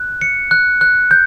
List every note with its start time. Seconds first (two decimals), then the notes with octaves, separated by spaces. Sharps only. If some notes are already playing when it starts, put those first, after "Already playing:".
Already playing: F#6
0.21 C#7
0.51 F#6
0.81 F#6
1.11 G6